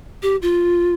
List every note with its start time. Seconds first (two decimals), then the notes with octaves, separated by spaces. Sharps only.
0.23 G4
0.42 F4